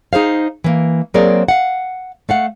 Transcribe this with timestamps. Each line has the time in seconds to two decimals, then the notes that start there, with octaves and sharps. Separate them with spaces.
0.13 D#4 G#4 C5 F5
0.64 E3 A#3
1.14 F#3 A#3 C4 G#4 A#4 D5
1.48 F5 F#5
2.29 A3 F5 F#5